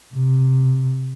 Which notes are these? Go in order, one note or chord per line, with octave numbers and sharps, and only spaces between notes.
C3